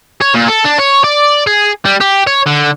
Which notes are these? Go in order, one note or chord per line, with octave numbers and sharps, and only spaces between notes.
C#5
A#2
A4
D4
C#5
D5
G#4
G3
G4
C#5
D3